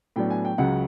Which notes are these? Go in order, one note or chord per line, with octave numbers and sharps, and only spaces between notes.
A2 F#3 B3 D4 G5
G#5
G5
C#2 C#3 F#3 F#5